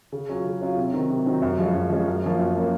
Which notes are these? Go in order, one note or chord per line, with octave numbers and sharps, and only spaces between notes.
C#3
F#3 C#4 F4
C#3
F#3 C#4 F4
C3
D#3 F#3 C4
C3
D#3 F#3 C4
F#2
F3 G#3 C#4
F#2
F3 G#3 C#4
F#2
F3 A#3 C#4
F#2
F3 A#3 C#4